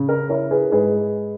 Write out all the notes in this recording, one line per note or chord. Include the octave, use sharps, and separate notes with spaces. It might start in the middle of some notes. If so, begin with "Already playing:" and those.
Already playing: C#3
A#4
E4 A#4 C#5
G#4 B4
G#2 G#4 B4